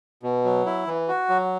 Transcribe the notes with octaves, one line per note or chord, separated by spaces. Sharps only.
B2
F#3
E4
E3
F#4
F#3